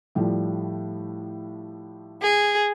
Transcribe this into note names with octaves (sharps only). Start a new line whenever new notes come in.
A2 F3 G3
G#4